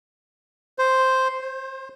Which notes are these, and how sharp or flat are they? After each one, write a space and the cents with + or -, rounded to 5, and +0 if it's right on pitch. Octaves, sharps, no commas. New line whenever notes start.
C5 +0
C5 +30